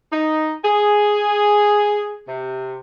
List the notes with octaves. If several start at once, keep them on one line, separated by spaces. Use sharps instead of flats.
D#4
G#4
C3